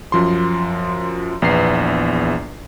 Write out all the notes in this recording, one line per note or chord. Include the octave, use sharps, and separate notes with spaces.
F#2 F3 C6
A#1 E2 E3 B3 C7